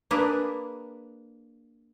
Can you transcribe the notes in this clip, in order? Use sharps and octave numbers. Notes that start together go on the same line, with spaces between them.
A#3 D4 G#4 B4